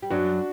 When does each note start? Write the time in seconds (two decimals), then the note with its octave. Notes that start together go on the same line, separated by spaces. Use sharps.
0.03 G3
0.10 F#2 F#3 D4 F#4